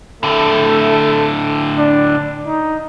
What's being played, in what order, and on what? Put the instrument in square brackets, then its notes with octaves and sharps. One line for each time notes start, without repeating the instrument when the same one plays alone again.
[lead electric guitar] A2 D3 [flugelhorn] A3
[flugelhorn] D4
D#4